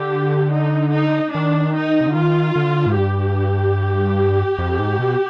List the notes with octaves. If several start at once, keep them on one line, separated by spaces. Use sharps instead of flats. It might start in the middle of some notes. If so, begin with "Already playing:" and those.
Already playing: D3 G4
D#4
D#4
D#3 D4
D#4
C3
D3
D#3 F4
D3
G#2
G2 G4
F2
G#2
B2